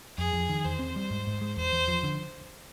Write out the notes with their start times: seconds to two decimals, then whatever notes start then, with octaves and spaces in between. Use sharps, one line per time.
0.17 F2 G#4
0.33 F2
0.49 D#3
0.65 E2 C5
0.79 C4
0.96 G3
1.11 G#2
1.27 G#2
1.41 G#3
1.57 E2 C5
1.73 E2
1.88 F3
2.03 D3